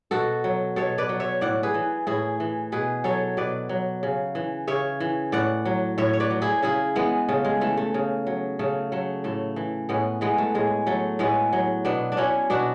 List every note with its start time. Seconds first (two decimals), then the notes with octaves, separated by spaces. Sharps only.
0.11 B2 F#4 A4
0.44 F#3
0.76 B2 A4 C#5
0.98 B4 D5
1.09 F#3
1.20 C#5 E5
1.41 A2 D5 F#5
1.63 G#4 B4
1.74 E3
2.07 A2 E4 G#4
2.40 E3
2.72 B2 G#4 B4
3.04 F#3 A4 C#5
3.37 B2 B4 D5
3.69 F#3
4.03 C#3
4.35 E3
4.67 C#3 C#5 E5
5.00 E3
5.32 A2 D5 F#5
5.65 F#3
5.98 A2 C#5 E5
6.13 C#5
6.20 B4 D5
6.30 F#3
6.42 E4 G#4
6.63 C#3 E4 G#4
6.95 E3 G#3 B3
7.28 C#3 A3
7.45 G#3
7.61 E3 A3
7.77 A3
7.94 C#3
8.27 F#3
8.59 C#3 A3
8.92 F#3 A3
9.24 A2 A3
9.56 E3
9.89 A2 G#3 B3
10.21 E3 G#3 B3
10.38 A3
10.54 A2 G#3
10.87 F#3 A3
11.19 A2 G#3 B3
11.53 F#3
11.85 B2 B3 D4
12.12 D4
12.17 F#3 C#4 E4
12.50 B2 D4 F#4